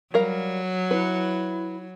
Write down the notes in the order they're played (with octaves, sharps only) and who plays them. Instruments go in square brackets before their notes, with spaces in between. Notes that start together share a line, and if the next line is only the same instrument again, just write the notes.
[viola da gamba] F#3 [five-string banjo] G3 A#4 F5
[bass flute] E4 [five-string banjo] B4